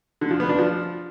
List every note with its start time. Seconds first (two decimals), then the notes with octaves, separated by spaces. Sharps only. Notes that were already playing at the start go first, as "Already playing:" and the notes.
0.21 D3
0.31 F3
0.40 B3
0.49 D4
0.59 F3